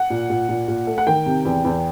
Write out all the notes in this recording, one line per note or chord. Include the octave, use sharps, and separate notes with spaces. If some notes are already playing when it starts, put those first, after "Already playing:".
Already playing: F#5
A#2
A#2
A#2
A#2
A3
F#5
D#3 G5
C3
E2
E2